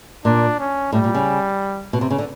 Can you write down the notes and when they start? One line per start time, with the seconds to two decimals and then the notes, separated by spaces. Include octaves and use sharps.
0.25 A#2 D4
0.60 C#4
0.93 A2 G3
1.04 A#2
1.15 C#3
1.93 B2
2.01 C3
2.10 C#3
2.18 D3